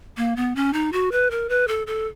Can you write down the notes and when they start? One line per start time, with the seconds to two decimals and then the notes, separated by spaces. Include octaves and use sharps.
0.17 A#3
0.36 B3
0.56 C#4
0.73 D#4
0.93 F#4
1.12 B4
1.31 A#4
1.49 B4
1.68 A4
1.87 A4